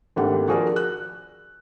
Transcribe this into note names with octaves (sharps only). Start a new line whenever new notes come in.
G#1 A3 A#3 D4 G4 F#5
F3 F#4 G#4 A#4 D5
F#6